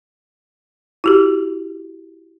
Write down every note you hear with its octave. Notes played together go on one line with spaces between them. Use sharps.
E4 F#4 G4